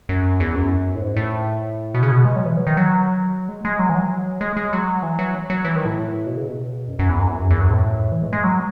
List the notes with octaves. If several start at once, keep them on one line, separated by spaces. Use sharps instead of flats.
F#2
E2
F#2
A2
G#2
A2
B2
C#3
B2
G#3
F#3
E3
F#3
D#3
F#3
G#3
G#3
F#3
E3
F#3
G#3
G#3
F#3
E3
F#3
F#3
E3
D#3
A2
B2
C#3
B2
F#2
F#2
E2
F#2
E2
F#2
E2
F#2
A2
E3
G#3
G#3
F#3